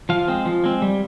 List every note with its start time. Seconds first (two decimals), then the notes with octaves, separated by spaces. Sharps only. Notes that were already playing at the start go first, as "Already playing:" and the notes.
0.09 F3 F5
0.28 G#3 C4
0.46 F3
0.64 G#3 C4
0.82 G3